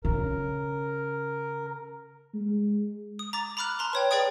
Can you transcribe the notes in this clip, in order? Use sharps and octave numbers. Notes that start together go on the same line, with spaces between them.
C#3 A#4
G#3
D#6
A#5 D6 A6
A#5 B5 D6 F6 F#6
A5 A#5 C6
B4 C#5 G5
G#4 B4 D5 G5 D#6